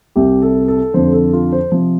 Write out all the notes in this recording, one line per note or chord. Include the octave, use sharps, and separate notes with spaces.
C2 C3 G3 G4
A4
A4
F2 D3 F3 C5
A4
F4
C5
C3 F3